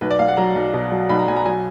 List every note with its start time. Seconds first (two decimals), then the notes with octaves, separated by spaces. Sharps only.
0.01 B1 B4
0.11 D5
0.19 B1 F5
0.28 F#5
0.37 F#3 A#5
0.55 B1
0.73 B2
0.92 F#3
1.09 B1 B5
1.19 A#5
1.28 B1 G#5
1.36 A#5
1.46 F#3 G#5